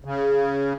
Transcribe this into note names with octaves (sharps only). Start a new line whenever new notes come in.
C#3